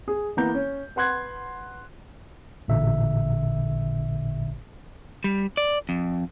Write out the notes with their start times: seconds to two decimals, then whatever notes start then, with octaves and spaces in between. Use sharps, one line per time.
0.08 G#4
0.37 E3 A#3 B3 E4 A#5 G6
0.54 C#4
0.96 B4 F#5 C6 F#6 G#6
2.68 A1 A#2 D3 E5
5.24 G3
5.57 D5
5.89 F2